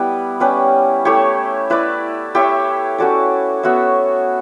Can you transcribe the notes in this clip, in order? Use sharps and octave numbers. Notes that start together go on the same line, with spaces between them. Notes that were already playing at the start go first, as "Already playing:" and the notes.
Already playing: G3 B3 E4 B4
G3 C#4 G4 B4
A3 E4 G4 C#5
E4 B4 D5
E4 G4 C#5 E5
C#4 F#4 A4 D5
B3 F#4 C#5 E5